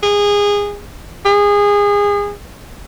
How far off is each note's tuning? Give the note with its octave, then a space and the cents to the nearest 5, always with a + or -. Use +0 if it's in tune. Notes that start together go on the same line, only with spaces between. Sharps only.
G#4 -20
G#4 -25